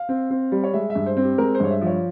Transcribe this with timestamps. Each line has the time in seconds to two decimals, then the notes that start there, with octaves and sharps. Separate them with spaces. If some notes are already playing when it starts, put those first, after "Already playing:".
Already playing: F5
0.09 C4
0.30 C4
0.52 G3
0.64 C#5
0.74 G#3 E5
0.90 E5
0.95 G2
1.06 C5
1.17 C4
1.22 G4
1.38 G#3 A#4
1.55 C5
1.60 G2 C#5
1.70 E5
1.81 F3
1.87 C#5